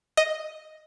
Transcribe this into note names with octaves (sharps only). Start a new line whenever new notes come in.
D#5